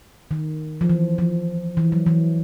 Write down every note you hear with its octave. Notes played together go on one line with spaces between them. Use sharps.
D#3
F3
E3
F3
E3
F#3
E3